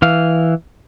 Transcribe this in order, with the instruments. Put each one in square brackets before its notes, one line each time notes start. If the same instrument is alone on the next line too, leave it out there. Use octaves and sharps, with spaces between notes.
[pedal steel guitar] E3 F5